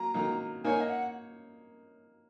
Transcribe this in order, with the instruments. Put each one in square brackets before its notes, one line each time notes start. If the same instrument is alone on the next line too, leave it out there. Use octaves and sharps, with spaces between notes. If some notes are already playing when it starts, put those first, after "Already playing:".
Already playing: [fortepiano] F#3 A#3 [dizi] A#5
[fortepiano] D#3 F#3 A#3 D#4
[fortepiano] A#3 D#4 A#4 C#5 [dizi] G#5
[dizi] D#5
F#5